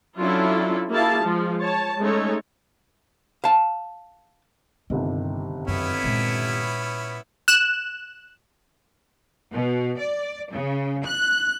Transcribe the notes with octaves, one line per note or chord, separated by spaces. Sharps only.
F#3 C#4 D4 E4 F4 A4
A#3 E4 F#4 G#4 F5 A5
F3 G#3
C#5 A5
G#3 A3 C#4 D#4 A4 C#5
F5 A5
G1 G2 C3 D#3
F#2 B3 C#4 E4
A#2 G#3
F#6 E7
B2
D5
C#3
F#6